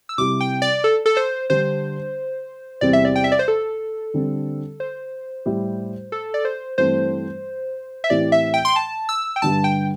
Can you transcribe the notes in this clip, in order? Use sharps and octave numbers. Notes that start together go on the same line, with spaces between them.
E6
C3 G3 E4 G4 D6
G5
D5
A4
A4
C5
D3 G3 D4 G4 C5
E2 C3 G3 C4 D5
E5
D5
G5
E5
D5
C5
A4
D3 G3 C4
C5
A2 G3 E4 G4
A4
D5
C5
G2 E3 A3 C4 C5
E5
A2 E3 C4 G4 D5
E5
G5
C6
A5
E6
G5
G2 D3 G3 A5
G5